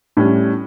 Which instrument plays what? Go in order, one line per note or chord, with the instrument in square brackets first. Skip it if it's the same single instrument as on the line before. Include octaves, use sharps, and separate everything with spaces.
[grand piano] A2 G3 C#4